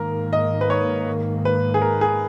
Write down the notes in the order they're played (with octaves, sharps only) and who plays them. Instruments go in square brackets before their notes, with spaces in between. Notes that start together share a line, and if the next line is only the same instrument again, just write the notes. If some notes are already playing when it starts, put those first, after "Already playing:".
Already playing: [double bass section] G#2 D#3 A#3 [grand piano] A#4
[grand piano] D#5
B4
C#5
B4
G#4
A#4
G#4